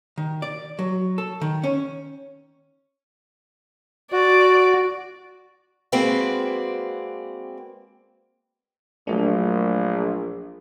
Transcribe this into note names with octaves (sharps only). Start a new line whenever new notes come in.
D#3
D5
F#3
A4
D#3
C#4
F#4 D5
G#3 A#3 C4 F#4 B4 D5
A#1 F#3 A3 D4